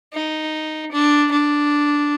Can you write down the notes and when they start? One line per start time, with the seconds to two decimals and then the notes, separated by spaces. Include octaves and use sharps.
0.13 D#4
0.91 D4
1.31 D4